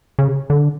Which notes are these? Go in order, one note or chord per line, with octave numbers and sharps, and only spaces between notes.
C#3
D3